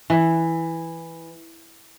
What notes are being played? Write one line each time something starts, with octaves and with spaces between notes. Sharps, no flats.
E3